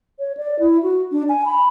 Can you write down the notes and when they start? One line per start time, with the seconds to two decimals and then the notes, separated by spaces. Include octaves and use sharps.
0.19 C#5
0.37 D5
0.59 E4
0.83 F#4
1.12 D4
1.29 G#5
1.46 B5